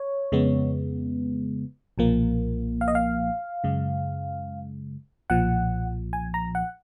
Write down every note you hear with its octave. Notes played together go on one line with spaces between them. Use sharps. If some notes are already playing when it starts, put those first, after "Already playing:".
Already playing: C#5
F2 C#3 G#3 B3
B1 A#2 F3 A#3
F5
D#5
F5
F#2 C#3 G#3
B1 A#2 F3 F#5
G#5
A#5
F#5